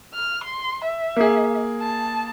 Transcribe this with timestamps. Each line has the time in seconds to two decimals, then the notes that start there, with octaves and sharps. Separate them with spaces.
0.14 F6
0.44 C6
0.84 E5
1.16 A#3 G#4
1.82 A5